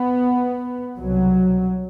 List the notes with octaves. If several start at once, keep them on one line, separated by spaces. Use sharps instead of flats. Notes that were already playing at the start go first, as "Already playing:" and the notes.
Already playing: B3
C2 B2 F#3